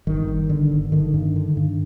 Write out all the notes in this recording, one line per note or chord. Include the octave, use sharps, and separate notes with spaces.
G1 D#3
G1
D3
G1
D3 D#3
G2
D3
G2